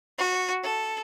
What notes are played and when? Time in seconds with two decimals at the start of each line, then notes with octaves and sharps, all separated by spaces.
0.19 F#4
0.64 A4